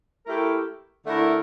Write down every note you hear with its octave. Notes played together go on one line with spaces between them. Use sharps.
A3 E4 G4 A#4
D3 A3 E4 A#4